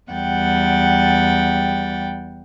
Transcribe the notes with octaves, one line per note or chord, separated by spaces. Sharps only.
E2 G3 F#5 G5 A6